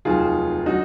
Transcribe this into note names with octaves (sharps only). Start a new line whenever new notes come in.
F1 D#2 D#3 F#3 F4 G#4
D3 F#3 D#4 F#4